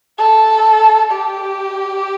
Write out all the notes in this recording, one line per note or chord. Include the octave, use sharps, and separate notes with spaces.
A4
G4